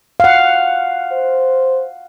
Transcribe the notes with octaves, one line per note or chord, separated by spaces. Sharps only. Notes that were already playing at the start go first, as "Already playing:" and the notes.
F5 F#5
C5